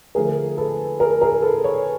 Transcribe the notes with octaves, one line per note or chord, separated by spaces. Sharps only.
D3 F3 A3 G#4 A#4
A4 B4
G#4 A#4
G#4 A#4
A4 B4
B4 C#5